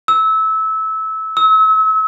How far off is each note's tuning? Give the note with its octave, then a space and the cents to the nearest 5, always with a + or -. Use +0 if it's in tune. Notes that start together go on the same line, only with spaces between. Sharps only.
E6 -20
E6 -35